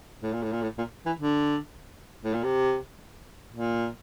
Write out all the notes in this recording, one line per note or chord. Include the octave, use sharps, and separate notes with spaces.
A2
A#2
A2
A#2
A2
A#2
E3
D3
A2
A#2
C3
A#2